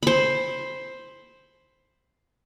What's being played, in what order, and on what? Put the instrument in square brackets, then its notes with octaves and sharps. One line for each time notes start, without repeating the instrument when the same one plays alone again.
[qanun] C5 B5